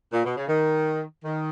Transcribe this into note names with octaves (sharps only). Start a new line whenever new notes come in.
A#2
B2
C#3
D#3
D#3